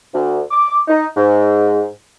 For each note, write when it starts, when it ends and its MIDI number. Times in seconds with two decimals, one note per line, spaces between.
0.13 0.40 38
0.51 0.78 86
0.87 1.05 63
1.15 1.86 44